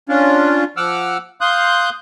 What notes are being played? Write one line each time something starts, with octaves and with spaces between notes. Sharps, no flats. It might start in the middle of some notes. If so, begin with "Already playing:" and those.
C#4 D4 F4
F3 F#5 D6 E6 F6
F5 C6 D#6 F#6 G6